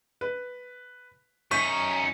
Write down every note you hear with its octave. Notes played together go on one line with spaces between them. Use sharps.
B4
F#2 C#4 D#4 C#6 G6 B6 D#7